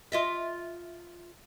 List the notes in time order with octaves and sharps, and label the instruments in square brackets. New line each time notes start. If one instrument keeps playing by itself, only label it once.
[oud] F4 D#5 E5